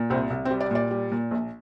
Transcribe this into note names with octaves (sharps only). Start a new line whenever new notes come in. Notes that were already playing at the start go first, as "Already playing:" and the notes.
Already playing: A#2
C2 C4
C2
C4
G3
D5
A#2 D5
G3
A#2
A#1